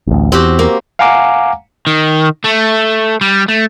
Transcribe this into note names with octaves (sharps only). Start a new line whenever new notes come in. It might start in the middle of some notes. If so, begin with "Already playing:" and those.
A1 D2
E2 C4 F#4 G4
A#3
F5 F#5 G#5 A#5 D6
D#3
A3
G3
A3